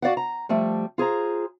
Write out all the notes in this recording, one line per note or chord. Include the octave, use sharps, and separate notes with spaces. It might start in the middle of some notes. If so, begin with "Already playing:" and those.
F#4 D5 F5 F#5
A#5
F3 G3 A3
F4 G#4 C5 A#5